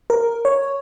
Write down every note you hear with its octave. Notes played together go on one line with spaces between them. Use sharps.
A#4
C#5